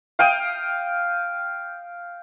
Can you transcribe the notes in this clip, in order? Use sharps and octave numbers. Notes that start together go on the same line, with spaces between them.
F5 G5 D#6